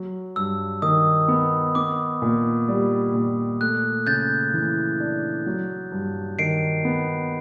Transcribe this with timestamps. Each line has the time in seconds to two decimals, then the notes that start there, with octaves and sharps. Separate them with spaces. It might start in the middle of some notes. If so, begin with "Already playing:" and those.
Already playing: F#3
0.36 G2 E6
0.82 D#3 D#6
1.28 B3
1.75 B3 D6
2.22 A#2
2.68 G3
3.14 A#2
3.61 A3 F#6
4.07 C#3 G6 A6
4.54 E3
5.00 D4
5.46 F#3
5.92 G2
6.39 D#3 C7 D7
6.85 B3